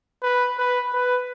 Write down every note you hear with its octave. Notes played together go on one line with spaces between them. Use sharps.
B4
B4
B4